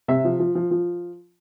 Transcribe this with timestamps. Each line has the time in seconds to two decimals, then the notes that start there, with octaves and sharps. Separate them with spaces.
0.08 C3 E5
0.24 F3
0.40 F3
0.55 F3
0.71 F3